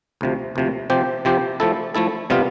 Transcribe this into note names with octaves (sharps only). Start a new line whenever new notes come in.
D2 C3 F3
D2 C3 F3
C3 F3 C4 G4 C5
C3 F3 C4 G4 C5
F3 A3 E4 A4
F3 A3 E4 A4
C3 G3 B3 F4